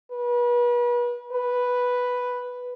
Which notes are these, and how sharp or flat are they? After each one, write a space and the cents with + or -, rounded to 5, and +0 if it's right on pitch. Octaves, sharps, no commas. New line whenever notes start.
B4 -35
B4 +0